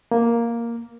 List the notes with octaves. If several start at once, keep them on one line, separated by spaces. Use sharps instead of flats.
A#3